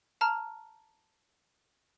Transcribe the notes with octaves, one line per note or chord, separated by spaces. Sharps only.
A5 A#5 F6